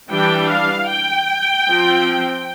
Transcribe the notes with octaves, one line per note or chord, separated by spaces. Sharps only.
E3 G3 D4 G5
F5
G5
F3 C4